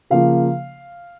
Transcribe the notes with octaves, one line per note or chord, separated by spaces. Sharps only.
C#3 F3 A#3 F5